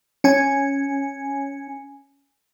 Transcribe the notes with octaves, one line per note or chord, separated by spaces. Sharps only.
C#4 G#5